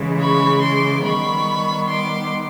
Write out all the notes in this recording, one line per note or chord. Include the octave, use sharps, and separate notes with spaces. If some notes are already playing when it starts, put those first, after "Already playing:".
Already playing: C#3 E3 G#3
B5 C#6
C6 D6
D#3 G3 B3 B5 C#6
C6 D6